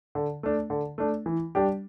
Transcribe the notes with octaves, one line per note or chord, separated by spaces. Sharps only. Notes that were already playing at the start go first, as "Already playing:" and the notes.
D3
A3 D4
D3
A3 D4
E3
G3 D4 G4